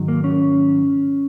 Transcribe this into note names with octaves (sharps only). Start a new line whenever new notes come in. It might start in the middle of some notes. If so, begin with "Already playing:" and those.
Already playing: G#2 D#3 F#3
A#3
C#4